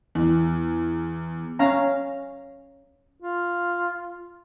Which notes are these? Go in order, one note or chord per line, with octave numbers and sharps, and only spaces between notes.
E2
C#4 F5 A#5
F4